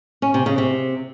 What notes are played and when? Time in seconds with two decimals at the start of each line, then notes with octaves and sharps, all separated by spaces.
0.22 C#4
0.34 C3
0.46 C#3
0.58 C3